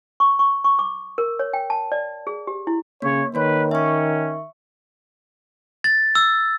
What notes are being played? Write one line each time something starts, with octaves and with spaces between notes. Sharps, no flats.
C#6
C#6
C#6
D6
A#4
C#5
G5
A5
D5
G#4
G4
E4
C#3 A#3 C#5
D#3 A#3 B4 C#5
C#4 E5 C#6
A6
E6